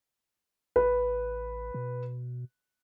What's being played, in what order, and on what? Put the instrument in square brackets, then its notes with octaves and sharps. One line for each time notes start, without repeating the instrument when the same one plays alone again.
[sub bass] A1 [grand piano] B4
[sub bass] B2